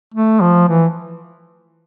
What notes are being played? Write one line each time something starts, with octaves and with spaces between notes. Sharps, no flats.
A3
F3
E3